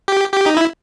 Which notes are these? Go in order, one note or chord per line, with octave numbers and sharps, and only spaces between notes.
G4
G4
D#4
E4